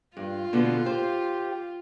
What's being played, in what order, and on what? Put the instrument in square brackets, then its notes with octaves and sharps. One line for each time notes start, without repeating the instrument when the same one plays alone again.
[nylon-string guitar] G2 [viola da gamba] F4
[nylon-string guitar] B2 D3 B3
[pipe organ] G4 [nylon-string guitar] C5